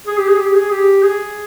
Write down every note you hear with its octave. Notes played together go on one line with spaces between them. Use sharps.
G#4
G4
G#4
G4
G#4
G4
G#4